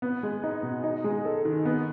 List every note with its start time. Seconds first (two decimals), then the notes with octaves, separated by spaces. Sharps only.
0.02 B3
0.23 G#3
0.44 D#4
0.63 B2
0.84 D#4
1.04 G#3
1.25 A4
1.45 D#3
1.65 B3